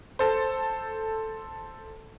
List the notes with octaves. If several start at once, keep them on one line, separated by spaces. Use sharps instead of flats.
A4 C5